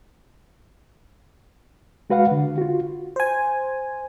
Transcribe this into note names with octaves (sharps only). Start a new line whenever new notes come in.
G#3 F#4 B4 F5 F#5
D3
F4 F#4
C5 G#5